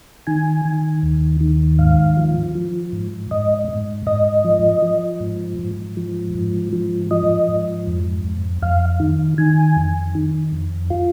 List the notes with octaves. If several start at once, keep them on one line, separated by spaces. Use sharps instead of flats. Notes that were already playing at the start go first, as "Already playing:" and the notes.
D#3 G#5
D#3
D#2
D#3
G#2 F5
F3
F3
G#2
G#2 D#5
G#2
G#2 D#5
F3
F3
G#2
G#2
F3
G#2
F3
F3 D#5
G#2
F2
F2
F2 F5
D#3
D#3 G#5
F2
D#3
F2
F4